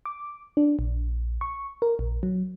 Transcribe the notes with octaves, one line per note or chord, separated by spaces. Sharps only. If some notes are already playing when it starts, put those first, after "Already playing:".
D6
D4
A#1
C#6
A#4
A#1
F#3